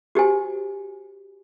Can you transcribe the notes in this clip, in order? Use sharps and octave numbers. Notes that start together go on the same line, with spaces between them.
F#4 G4 C5 G#5